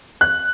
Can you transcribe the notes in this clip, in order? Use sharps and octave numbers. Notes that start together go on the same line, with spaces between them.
F#6